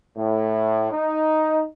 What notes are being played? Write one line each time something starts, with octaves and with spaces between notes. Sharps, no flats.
A2
D#4